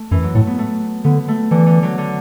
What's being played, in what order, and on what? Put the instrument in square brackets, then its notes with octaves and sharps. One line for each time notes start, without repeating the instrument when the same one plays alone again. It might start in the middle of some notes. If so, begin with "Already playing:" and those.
Already playing: [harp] A3
[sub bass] F#2 [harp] E3
[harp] F#3
[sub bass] A2 [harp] A3
[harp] B3
A3
[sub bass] D3 [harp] B3
[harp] A3
[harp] D3 [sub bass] E3
[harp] D3
F#3
D3